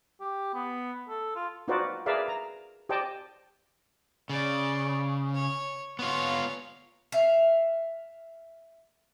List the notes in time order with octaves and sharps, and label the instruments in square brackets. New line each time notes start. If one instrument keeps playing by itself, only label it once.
[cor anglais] G4
B3
A4
F4
[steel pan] D#4 F4 F#4 B4 C5 D5
G#4 A#4 B4 D5 E5 F5
A#5
G4 C5 D5 D#5 G5 A5
[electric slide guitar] C#3 [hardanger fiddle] D5
[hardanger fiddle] C#5
[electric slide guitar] B3 F4 [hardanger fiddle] C#5 F5
[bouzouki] E5 F5